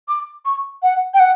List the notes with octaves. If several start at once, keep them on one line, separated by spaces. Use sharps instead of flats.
D6
C#6
F#5
G5
F#5